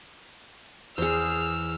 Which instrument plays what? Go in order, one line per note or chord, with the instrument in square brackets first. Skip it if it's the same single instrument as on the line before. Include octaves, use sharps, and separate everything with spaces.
[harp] E2 [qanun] G#4 C5 [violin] E6 F6